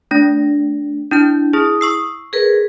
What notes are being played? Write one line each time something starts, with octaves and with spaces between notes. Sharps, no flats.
A3 D4 A#6
D4 E4 G6
E4 G#4 D#6
C#6 E6 C7
G#4 A#4 B4